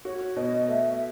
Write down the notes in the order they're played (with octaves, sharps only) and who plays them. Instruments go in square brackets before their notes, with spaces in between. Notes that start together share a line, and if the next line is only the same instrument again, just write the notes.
[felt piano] F#4 [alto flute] C#5
[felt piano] B2 [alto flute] D#5
[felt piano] A3 [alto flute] E5
[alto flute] E5